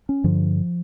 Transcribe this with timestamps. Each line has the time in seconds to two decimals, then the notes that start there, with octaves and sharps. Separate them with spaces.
0.09 C#4
0.24 G2 D3 F3